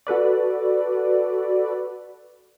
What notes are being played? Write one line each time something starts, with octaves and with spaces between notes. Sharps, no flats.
F#4 A4 B4 D5